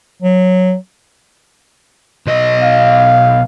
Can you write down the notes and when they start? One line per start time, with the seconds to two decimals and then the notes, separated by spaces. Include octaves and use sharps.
0.22 F#3
2.27 B1 D#5
2.63 F5